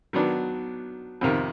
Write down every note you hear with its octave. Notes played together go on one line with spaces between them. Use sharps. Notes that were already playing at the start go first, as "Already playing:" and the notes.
D#3 F#3 B3 D4
F2 C3 D#3